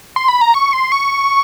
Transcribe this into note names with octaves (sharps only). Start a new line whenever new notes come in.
C6
B5
A#5
C#6
C6
C#6